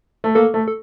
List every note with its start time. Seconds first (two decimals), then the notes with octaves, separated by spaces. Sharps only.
0.24 A3
0.35 A#3 A4
0.54 A3
0.68 A4